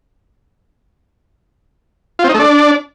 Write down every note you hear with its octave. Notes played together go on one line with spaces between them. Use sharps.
F4
C4
D#4
A3
D4